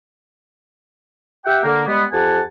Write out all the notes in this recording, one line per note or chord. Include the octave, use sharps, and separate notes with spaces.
G4 E5 F#5 G5
D3 A#3
G3 G#3 B3
F2 G4 F#5 G#5 A5